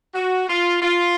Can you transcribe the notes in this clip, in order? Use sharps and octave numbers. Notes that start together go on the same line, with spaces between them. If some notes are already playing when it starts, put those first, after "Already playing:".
F#4
F4
F4